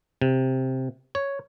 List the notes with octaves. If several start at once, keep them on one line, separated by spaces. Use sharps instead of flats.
C3
C#5